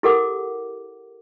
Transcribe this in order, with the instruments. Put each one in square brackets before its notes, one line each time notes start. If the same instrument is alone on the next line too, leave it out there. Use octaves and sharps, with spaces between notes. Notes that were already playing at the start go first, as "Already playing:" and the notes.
[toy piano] E4 G4 A4 A#4 F#5 D6